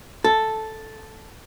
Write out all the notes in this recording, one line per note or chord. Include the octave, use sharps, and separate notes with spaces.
A4